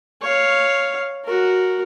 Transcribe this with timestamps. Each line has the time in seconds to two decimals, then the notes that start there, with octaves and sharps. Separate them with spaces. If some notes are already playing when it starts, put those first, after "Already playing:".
0.22 C#5 F5
1.25 F#4 A#4